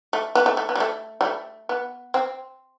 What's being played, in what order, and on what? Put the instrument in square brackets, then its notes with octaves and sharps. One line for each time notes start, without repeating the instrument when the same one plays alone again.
[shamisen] A3
B3
A3
A3
B3
G3
A3
G3
A3
B3
C4